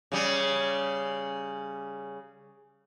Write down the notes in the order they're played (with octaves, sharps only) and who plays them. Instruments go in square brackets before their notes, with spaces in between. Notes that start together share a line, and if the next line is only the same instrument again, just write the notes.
[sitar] C#3 G3